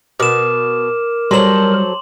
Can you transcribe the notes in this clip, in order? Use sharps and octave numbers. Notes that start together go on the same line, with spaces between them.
B2 A#4 D6 E7
F#3 G3 A4 C5 C6 F#7